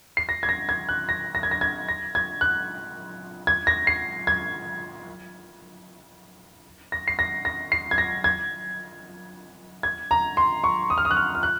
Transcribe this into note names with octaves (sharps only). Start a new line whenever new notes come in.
C7
A#6
G#6
A#6
G#6
F#6
A#6
A#6
G#6
A#6
G#6
A#6
G#6
F#6
G#6
A#6
C7
G#6
A#6
C7
A#6
A#6
C7
G#6
A#6
G#6
G#6
A#5
C6
C#6
D#6
F6
D#6
F#6
F6
F6
F#6